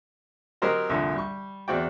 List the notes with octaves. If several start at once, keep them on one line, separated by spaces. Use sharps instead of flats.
F#3 C4 G4 A#4 C5 D#5
C2 F2 A#2 D3
G3 C#6
E2 C4 F#4 D5 G5